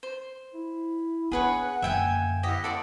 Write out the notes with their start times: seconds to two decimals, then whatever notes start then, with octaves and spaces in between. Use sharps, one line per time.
0.03 C5
0.54 E4
1.32 B3 D4 G#4 B4 C#5 F#5
1.82 F#2 D3 A#3 E5 G5 G#5
2.43 E4 G4 D#5 F#5
2.64 A4 D5 C6